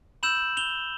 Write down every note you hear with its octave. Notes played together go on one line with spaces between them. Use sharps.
B5 E6 G6 E7 F#7
F7 G7